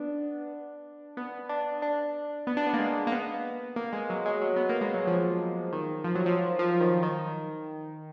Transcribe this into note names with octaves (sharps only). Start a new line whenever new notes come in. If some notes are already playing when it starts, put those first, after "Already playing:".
Already playing: B3 D4
B3
D4
D4
B3
D4
B3
A#3
G#3
A#3
B3
A#3
G#3
F#3
G#3
F#3
B3
A#3
G#3
F#3
F3
D#3
F3
F#3
F3
F3
D#3
D#3